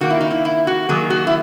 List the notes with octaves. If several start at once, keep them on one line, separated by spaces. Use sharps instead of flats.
D#3 A#3 F#4
E4
D#4
E4
E4
F#4
D#3 F#3 A#3 G#4
F#4
E4